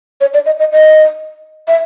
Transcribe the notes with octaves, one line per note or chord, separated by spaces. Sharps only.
C#5
D5
D#5
D#5
D#5
E5